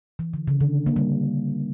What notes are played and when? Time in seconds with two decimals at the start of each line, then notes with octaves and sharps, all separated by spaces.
0.19 E3
0.34 D3
0.48 C#3
0.61 D3
0.86 A#3
0.96 G3